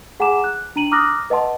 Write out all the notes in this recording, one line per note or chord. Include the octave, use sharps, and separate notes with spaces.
G#4 F#5 G#5 A#5 D6 E7
F#6
D4 A#5 D#7 F#7
A#5 D6 D#6 F6 F#6 A#6
B4 D#5 F#5 A5 C6